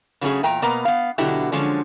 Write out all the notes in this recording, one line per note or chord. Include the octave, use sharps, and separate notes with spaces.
C#3 F#3 A3 C#4 G#4
E2 A#2 G5 A#5
B2 A#3 B3 A#5
B3 F5
B2 D3 F#3 E4 F#4 G4
D3 F3 F#3 G#3 C#4